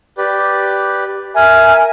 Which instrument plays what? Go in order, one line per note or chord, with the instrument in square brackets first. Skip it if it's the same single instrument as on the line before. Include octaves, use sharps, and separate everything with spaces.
[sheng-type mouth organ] G4 B4 D5
[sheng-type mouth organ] A#4 [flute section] E5 G#5 F6